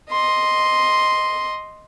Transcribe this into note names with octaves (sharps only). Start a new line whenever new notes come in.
D#5 C6